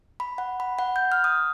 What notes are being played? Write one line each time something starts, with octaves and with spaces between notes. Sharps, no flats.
B5
F#5
B5
F#5
G6
F6
D#6